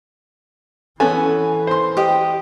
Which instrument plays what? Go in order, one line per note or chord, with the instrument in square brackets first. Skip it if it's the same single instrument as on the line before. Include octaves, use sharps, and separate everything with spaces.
[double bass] E3 [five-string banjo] B3 C#4 A4 [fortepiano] G#5
[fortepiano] C5 C6
[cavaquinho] G4 D#5